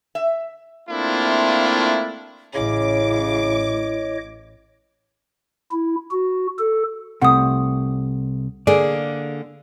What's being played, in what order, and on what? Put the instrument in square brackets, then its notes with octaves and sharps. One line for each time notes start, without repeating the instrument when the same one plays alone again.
[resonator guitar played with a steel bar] E5
[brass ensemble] A3 A#3 C4 D4 E4 F4
[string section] A1 D6 [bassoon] C#3 [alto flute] E4 [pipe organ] C#5 D#5
[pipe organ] E4
F#4
A4
[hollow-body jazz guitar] C2 C3 A3 [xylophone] F#5 D#6
[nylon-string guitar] D3 A#3 G#4 [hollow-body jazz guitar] D5